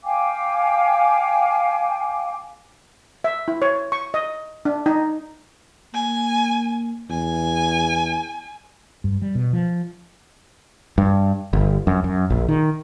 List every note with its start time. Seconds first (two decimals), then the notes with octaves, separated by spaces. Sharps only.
0.04 F5 G5 G#5 D6
3.24 E5
3.48 E4
3.62 C#5
3.92 C#6
4.14 D#5
4.65 D4
4.86 D#4
5.94 A#3 G#5
7.10 E2 G#5
9.04 G2
9.22 G3
9.35 B2
9.53 F3
10.98 G2
11.53 G1
11.87 F#2
12.04 F#2
12.30 A#1
12.49 D#3